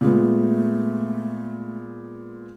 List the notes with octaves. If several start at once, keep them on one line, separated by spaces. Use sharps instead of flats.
A#2 G#3 A3 B3